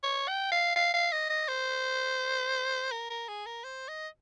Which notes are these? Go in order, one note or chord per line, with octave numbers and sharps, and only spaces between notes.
C#5
G5
F5
F5
F5
D#5
D#5
C5
A#4
A#4
G#4
A#4
C5
D#5